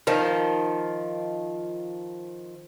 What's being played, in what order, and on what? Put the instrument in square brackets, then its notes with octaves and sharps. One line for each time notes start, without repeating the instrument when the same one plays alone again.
[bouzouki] D#3 F3